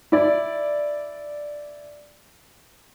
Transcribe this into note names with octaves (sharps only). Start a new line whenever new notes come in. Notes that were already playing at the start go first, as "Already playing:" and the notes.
E4 D5